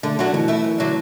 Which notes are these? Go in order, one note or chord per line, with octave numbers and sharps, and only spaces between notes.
D3 A3
F#3 A3 D4 F#4
B2 E3
A3 E4
F#2
D3 F#3 D4